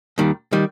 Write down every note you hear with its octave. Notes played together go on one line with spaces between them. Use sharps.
D#2 D#3 G3
D#3 G3